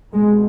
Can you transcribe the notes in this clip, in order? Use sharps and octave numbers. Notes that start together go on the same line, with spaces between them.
C2 B2 G#3